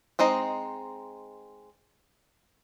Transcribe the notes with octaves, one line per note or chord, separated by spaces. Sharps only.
G#3 C4 D#4 D#5